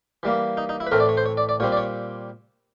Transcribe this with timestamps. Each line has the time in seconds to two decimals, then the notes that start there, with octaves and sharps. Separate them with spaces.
0.23 E3 G3 A#3
0.57 D#4
0.69 D#4
0.80 E4
0.87 B4
0.92 A2 E3 A3 C4 A#4
1.00 D5
1.09 C#5
1.17 C5
1.26 C#5
1.37 D5
1.49 D5
1.60 A#2 G3 C4 C#5
1.72 D5
1.77 C#5